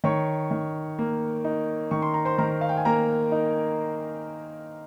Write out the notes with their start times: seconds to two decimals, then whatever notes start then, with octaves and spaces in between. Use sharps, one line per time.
0.04 D#3 C#5 C#6
0.51 D#3
0.99 A#3
1.44 D#4
1.91 D#3 C#6
2.02 C6
2.14 A#5
2.25 C5 C6
2.38 D#3 A#4 A#5
2.61 F5
2.69 G5
2.77 G#5
2.85 A#3 A#4 A#5
3.32 D#4